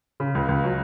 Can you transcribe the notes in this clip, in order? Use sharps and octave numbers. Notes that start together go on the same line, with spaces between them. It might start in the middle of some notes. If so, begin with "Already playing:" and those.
C#3
C#2
C#2
F#3